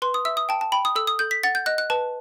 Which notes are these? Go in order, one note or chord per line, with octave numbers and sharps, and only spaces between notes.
B4 C6
D#6
E5 E6
D#6
G5 A5
A5
G5 B5
D#6
A4 E6
D#6
A4 G6
B6
F#5 A6
G6
D#5 F#6
F#6
B4 A5